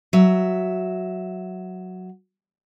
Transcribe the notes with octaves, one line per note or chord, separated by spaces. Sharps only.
F#3 E5